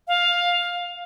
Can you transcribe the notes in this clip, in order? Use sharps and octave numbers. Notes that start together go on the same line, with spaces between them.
F5